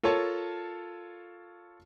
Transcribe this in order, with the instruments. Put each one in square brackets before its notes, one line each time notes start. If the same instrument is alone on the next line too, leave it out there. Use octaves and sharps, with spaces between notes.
[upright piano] F4 A4 A#4 C#5 A5